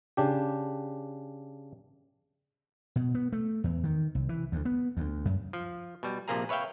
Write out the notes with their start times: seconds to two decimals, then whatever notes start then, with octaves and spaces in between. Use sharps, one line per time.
0.17 C#3 D4 G4
2.96 B2
3.14 B3
3.32 A3
3.64 E2
3.84 D#3
4.15 C2
4.29 E3
4.52 D2
4.65 B3
4.97 D2
5.25 F#2
5.53 F3
6.03 B2 G3
6.28 A#1 C3 F3 A#3 G#4 A#5
6.49 B4 C#5 E5 F5 G5